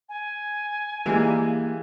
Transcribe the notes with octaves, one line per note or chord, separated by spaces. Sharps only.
G#5
E3 G3 G#3 A#3